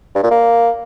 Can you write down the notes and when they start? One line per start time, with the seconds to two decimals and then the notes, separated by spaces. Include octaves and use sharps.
0.16 G2
0.23 A#2
0.31 A#3